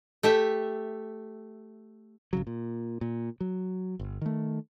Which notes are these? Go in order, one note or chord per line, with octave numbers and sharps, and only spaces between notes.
A3 G4 E5
G#1 C#3 F#3
A#2
A#2
F#3
G1
D#3 A3